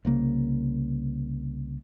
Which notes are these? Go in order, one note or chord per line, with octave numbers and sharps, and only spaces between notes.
C2 C#3 A#3